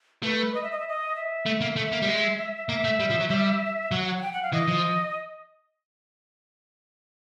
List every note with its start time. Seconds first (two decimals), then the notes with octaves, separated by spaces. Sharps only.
0.23 A3 B4
0.39 B4
0.55 D#5
0.63 E5
0.71 D#5
0.80 E5
0.88 D#5
1.16 E5
1.46 A3
1.62 A#3
1.77 A3 E5
1.92 A#3
2.02 G3
2.08 G#3
2.68 A#3 E5
2.84 A3
3.00 G3
3.10 F3
3.20 F#3
3.30 G3
3.92 F#3 F#5
4.07 F#5
4.18 F#5
4.22 G5
4.33 F#5
4.43 F5
4.53 E3 D#5
4.68 F3